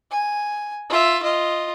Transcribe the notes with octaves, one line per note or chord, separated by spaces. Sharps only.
G#5
F4 E5
F4 D#5